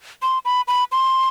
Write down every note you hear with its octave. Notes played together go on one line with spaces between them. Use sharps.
C6
B5
B5
C6